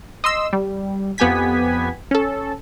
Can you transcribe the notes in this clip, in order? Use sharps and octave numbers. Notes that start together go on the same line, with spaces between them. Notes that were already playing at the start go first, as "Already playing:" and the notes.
D#5 C6 E6
G3
F2 B3 G4 G#5 G#6 B6
C#4 A4